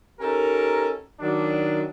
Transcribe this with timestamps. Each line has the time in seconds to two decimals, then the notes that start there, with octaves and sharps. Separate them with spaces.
0.20 C#4 D#4 G4 A4 A#4 A#5
1.20 D#3 F#3 D4